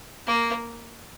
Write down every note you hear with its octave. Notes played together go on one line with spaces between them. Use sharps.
A#3